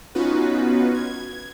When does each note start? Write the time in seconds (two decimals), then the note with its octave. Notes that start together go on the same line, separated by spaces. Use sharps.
0.15 B3 C#4 D#4 F4 F#4 B4
0.94 G#6